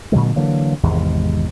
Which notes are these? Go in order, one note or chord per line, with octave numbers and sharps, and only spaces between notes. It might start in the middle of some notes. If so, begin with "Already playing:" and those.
A#2 D3 F#3 G#3
D3 E3 F#3 A#3
G#1 E2 C3 G#3